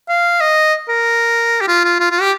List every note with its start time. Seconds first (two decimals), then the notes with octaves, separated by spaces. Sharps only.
0.09 F5
0.40 D#5
0.88 A#4
1.61 G4
1.68 F4
1.84 F4
2.00 F4
2.11 F4
2.21 G4